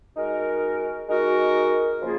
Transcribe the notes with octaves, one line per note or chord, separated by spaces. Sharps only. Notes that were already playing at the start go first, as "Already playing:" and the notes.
G#3 D#4 F#4 A#4
G#3 D#4 F#4 A#4
C#3 F3 A#3 F4 G#4